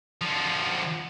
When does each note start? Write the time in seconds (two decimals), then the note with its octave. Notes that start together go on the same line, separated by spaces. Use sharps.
0.21 D3 F3